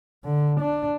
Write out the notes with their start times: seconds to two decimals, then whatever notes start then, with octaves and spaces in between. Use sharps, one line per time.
0.24 D3
0.60 D4